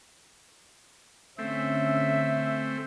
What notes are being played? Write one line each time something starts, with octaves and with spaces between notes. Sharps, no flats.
D3 A3 C4 C#4 E5